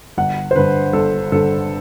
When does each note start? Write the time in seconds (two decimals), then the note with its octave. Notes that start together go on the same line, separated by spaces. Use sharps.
0.17 G1 F#5
0.51 C5
0.55 G2 D3 B4
0.93 G1 A4
1.32 G2 D3 A4